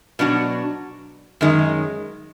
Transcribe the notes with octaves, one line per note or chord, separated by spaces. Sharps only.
B2 F#3 D4 F#4
F#2 D#3 G#3